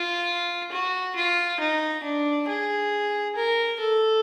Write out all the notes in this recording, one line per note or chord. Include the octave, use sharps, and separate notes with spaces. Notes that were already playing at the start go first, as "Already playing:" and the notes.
Already playing: F4
F#4
F4
D#4
D4
G#4
A#4
A4